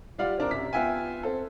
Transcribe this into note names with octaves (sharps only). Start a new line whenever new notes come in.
G3 F4 D5 F5 F#5
C4 D4 A#4
F#2 C3 B6
B3 F4 E5 G5 G#5
C4 A4